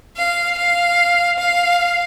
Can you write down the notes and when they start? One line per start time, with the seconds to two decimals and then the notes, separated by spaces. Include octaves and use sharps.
0.17 F5
0.58 F5
1.39 F5